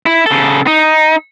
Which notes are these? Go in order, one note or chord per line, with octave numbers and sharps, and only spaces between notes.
E4
C#3 A4
D#4